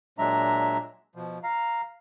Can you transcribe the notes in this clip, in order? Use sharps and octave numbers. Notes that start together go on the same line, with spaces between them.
A#2 F#3 G#3 D4 E5 A#5
B2 F3
F5 A#5